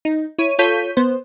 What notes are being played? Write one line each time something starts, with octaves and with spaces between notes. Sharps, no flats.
D#4
E4 C#5 D#7
F4 A4 C#5 G6 B6 D#7
B3 C5